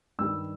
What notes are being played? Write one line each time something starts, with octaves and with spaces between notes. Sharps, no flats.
G2 D#3 G3 E6